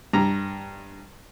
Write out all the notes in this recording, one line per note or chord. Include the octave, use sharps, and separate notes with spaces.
G2 A#5